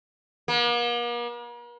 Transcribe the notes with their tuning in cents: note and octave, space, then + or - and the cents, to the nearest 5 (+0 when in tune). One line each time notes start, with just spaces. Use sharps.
A#3 +45